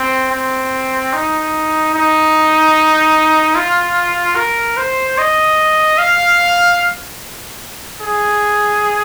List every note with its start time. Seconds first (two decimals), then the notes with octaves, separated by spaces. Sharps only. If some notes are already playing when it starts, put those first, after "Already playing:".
Already playing: C4
0.32 C4
1.13 D#4
1.94 D#4
3.56 F4
4.36 A#4
4.77 C5
5.18 D#5
5.98 F5
8.01 G#4